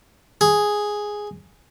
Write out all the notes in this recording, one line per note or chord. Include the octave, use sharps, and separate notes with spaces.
G#4